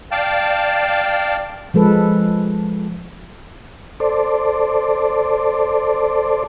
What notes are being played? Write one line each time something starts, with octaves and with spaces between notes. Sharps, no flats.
D5 F5 G5 A5
F3 G#3 A4 B4
A4 C5 D5